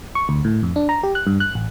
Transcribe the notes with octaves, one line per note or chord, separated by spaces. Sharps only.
C#6
D2
A2
F2
D4
A#5
G4
F#6
G2
F#6
A1